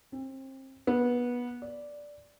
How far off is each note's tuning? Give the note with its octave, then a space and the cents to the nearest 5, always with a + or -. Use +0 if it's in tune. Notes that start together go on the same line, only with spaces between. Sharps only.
C4 +30
B3 -20
D5 -5